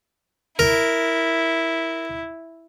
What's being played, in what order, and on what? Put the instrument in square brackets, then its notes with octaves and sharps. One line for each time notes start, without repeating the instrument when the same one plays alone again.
[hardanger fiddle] E4 [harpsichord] A#4